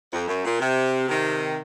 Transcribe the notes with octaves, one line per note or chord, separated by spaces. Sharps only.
F2
F#2
A#2
C3
C3 D#3